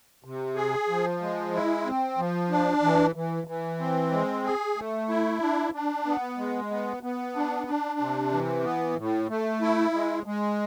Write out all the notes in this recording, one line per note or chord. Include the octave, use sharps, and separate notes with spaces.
C3
G#4
F3
G#3
E4
C4
F3
D4
E3
E3
E3
C4
G#3
G#4
A3
E4
D4
D4
B3
G#3
B3
B3
D4
D4
C3
E3
B3
A2
A3
E4
G#3
G#3